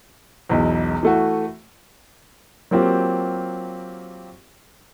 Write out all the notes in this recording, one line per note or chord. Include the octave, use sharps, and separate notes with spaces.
E1 B1 E2
E3 A3 F#4
F#3 A#3 C4 F4 G4